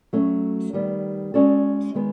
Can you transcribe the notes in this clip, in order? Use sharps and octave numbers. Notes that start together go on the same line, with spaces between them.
F#3 A3 C#4
D#3 G3 B3
G#3 C#4 F#4 A4 D5
D#3 G#3 B3